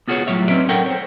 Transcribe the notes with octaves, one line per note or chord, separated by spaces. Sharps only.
B3 F4 F#4 G#4 C#5
A2 F#3 G3 C#5 E5
C4 C#4 D#4 B4 D5
A4 A#4 C#5 F#5 G5
C5 C#5